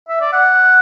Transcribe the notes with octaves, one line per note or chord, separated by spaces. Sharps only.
E5
D5
F#5